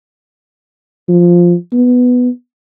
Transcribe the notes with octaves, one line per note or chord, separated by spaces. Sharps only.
F3
B3